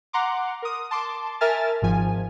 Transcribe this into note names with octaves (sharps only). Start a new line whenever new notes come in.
F#5 A#5 C6 D6
A#4 D#6
A5 C6 D6
A#4 E5 G#5 A5 F6 A6
G#1 G#2 F3 G#5